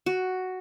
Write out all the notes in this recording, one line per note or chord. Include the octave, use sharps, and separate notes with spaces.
F#4